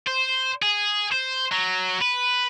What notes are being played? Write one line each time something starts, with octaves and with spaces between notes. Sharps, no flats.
C5
G#4
C5
F#3
B4